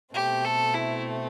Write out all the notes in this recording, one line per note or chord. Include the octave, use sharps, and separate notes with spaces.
B2 A3 C4 G4
A4
E4